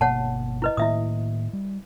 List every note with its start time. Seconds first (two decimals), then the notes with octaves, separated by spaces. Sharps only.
0.01 G1 B2 A#3 C#5 F#5 A5
0.62 E4 B4 D#5
0.77 A2 D#3 A#3 E4 E5 D#6
1.53 G3